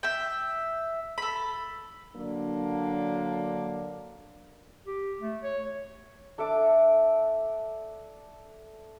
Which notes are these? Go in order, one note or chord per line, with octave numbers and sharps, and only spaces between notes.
E5 G5
A4 B5
D3 F#3 A#3 D4
G4
A3
C#5
D4 A4 E5 D6